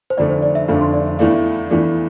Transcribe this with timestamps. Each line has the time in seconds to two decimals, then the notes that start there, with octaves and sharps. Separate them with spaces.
0.10 C5
0.17 F1 F2 D3 A3 D4 D5
0.30 C5
0.42 D5
0.55 E5
0.68 F1 F2 D3 A3 D4 F5
0.81 C6
0.94 D5
1.06 E5
1.19 E2 E3 A3 D4 F5
1.70 E2 E3 A3 D4